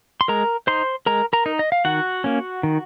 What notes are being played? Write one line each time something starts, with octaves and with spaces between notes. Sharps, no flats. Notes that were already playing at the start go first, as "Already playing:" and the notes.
C6
G#3 A#4 A#5
D#4 C5 C6
G#3 A#4 A#5
A#4 A#5
D#4
D#5
F5
D#3 F#4 F#5
A#3 C#4
D#3